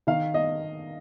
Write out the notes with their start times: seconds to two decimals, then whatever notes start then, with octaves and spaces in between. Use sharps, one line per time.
0.07 D#3 F5
0.34 D#5